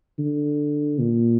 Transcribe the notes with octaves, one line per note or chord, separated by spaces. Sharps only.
D3
A#2